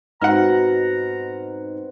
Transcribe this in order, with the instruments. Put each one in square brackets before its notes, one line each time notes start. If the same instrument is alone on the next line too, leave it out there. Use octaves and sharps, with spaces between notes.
[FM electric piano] G#2 D#4 [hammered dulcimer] B2 C4 [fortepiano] F#5 F6 [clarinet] A#5